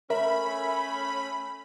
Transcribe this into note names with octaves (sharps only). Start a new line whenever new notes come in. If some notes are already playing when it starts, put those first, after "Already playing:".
A3 C#4 A#4 E5 B5